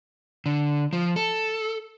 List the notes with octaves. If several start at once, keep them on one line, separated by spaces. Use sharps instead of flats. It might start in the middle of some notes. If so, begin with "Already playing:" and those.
D3
F3
A4